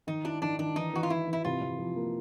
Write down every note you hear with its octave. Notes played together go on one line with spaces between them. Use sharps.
D#3 D#4
D4 E4
D#3 D4
D#3 D4
E3 D#4
E3 F#4
F4
E3 E4
E3 E4
C3 F4
C3
F3
A#3